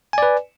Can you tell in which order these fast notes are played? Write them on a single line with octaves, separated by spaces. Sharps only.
G#5 D5 B4